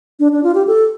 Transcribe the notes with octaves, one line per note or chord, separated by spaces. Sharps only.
D4
D4
F4
G4
A4